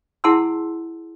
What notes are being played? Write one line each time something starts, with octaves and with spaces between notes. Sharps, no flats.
E4 G#4 F#5 A5 C6 E6